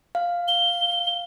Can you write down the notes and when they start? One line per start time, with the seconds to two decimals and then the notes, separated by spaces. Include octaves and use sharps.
0.15 F5
0.48 G7